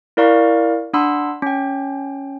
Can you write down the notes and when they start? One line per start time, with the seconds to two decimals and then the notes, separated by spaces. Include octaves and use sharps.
0.17 E4 A#4 D5 F5 A#5 C#6
0.94 D4 F#5 B5 C6 E6
1.42 C#4 G5